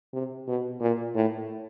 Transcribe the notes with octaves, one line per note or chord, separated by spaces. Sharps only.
C3
B2
A#2
A2